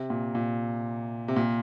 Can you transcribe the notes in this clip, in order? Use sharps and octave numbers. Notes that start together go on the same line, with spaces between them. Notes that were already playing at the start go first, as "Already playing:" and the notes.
Already playing: C3
A#2
A#2
C3
A#2